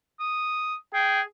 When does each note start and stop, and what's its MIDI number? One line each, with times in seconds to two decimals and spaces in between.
0.19 0.75 87
0.94 1.21 68
0.94 1.21 79